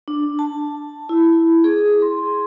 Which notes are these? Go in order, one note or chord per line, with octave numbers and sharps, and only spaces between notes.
D4
A5
E4
G#4
C6